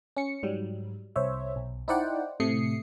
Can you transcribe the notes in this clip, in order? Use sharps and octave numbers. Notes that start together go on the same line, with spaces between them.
C#4 C#7
G#2 F#3 G3
C2 C5 C#5 E5
B1
D#4 E4 C5 D5 F#5 G5
A2 C3 A3 D#6 C7 C#7